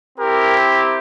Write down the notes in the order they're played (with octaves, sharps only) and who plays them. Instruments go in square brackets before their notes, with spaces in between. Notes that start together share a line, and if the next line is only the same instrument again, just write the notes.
[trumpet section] C4 E4 G4 A#4